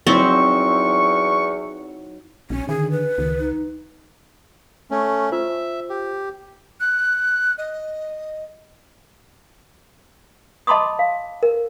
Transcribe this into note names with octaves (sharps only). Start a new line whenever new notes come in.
E2 F#3 C4 D#4 E4 C#6
A#1 C#4
D3 D#3 G#4
B4
C#2 D#3
D#4
A3 C#4
F4 C5 E5
G4
F#6
D#5
D#5 A5 B5 C6 D6 D#6
F5
A#4